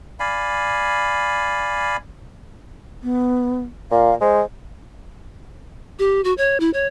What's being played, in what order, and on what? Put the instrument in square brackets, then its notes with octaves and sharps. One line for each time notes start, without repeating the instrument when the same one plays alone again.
[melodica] D5 F5 G#5 B5
[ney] B3
[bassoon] A#2 [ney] F5
[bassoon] G#3 [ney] C5
[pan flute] G4
F#4
C#5
E4
C#5